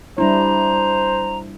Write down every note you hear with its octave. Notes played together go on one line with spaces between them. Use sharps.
G3 D4 E4 C5 A#5